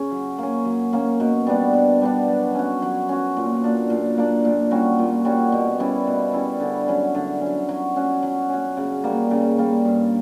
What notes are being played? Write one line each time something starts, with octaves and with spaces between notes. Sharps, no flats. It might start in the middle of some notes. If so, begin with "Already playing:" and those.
Already playing: C#3 C#4
F#3
A#3 C#4
F#3
A#3 C#4
B2
G3 B3 D4
B2
G3 B3 D4
F#3
C#4 F#4
F#3
C#4 F#4
A#2
A#3 D4
A#2
A#3 D4
A#2
G3 C#4 F#4
A#2
G3 C#4 F#4
B2
G3 C#4 E4
B2
G3 C#4 E4
D3
F#3 C#4
D3
F#3 C#4
F#3
C#4 F#4
F#3
C#4 F#4
C#3
G3 A#3
C#3
G3 A#3
G2